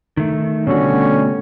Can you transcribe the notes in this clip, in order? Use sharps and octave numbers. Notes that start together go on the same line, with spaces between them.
D#3 A3
B2 D3 G3 A3 C#4 F#4